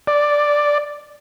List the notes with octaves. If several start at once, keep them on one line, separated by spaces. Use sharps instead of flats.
D5